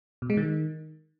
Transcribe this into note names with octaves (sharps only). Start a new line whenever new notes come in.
B2
G#3
D#3